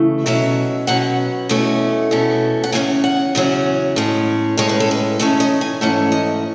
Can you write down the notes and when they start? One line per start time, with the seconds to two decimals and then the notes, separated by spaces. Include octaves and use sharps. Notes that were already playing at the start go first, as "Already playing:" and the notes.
Already playing: C#3 E3 A3
0.26 B2 F#3 C#4 E5
0.87 B2 F#3 C#4 F#5
1.49 E2 B2 A3 C#4
2.11 E2 B2 A3 C#4
2.64 F#5
2.72 E2 C#3 F#3 C#4 G#5
3.04 F#5
3.35 E2 C#3 F#3 C#4
3.96 A2 G#3 C#4
4.57 A2 G#3 C#4 C#5
4.69 B4
4.80 A4
4.91 B4
5.19 G#2 E3 A3 C#4 C#5
5.40 D#5
5.61 G#5
5.81 G#2 E3 A3 C#4 F#5
6.12 D#5